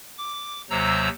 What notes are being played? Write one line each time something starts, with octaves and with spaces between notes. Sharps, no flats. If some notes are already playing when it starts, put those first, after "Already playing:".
D6
D#2 C3 F#3 C5 A#5 E6